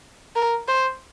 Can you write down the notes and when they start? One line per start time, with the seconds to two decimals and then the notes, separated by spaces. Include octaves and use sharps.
0.36 A#4
0.68 C5